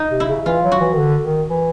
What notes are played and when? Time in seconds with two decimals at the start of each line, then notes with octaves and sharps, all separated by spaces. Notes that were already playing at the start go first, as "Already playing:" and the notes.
Already playing: D#4
0.11 C3
0.20 E4
0.29 C#3
0.46 E3 F4
0.63 F#3
0.72 F#4
0.80 E3
0.93 D#3
0.98 D3
1.23 D#3
1.50 E3